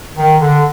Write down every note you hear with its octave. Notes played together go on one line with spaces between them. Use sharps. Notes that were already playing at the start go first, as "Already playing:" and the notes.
D#3
D3